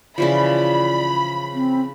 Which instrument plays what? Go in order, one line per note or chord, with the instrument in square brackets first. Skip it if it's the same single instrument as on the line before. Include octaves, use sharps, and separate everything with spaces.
[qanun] C#3 E3 F3 [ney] D5 [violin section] B5
[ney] C4